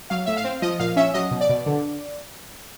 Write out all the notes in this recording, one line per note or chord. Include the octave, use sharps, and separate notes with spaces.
F#3 F5
A2 E5
F5
C4
F3 D#5
A#2 F5
C#4 E5
F#3 D#5
B2
D5
B2
D3